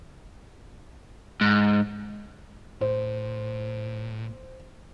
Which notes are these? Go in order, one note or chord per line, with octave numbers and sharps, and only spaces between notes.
G#2
A2 C5